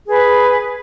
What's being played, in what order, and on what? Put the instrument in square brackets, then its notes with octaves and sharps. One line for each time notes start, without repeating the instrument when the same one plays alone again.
[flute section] G#4 B4